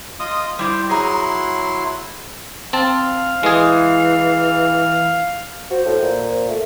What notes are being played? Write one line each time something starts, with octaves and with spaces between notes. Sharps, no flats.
F4 D#5 D#6
G3 E4 G4 C5
F#3 E4 G#4 A#5 C6
C4 F5 A5
E3 G#3 G#4
F#4 C5
A2
A#2
A3